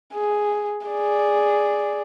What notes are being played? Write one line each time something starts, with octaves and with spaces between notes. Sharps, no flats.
G#4
G#4 D5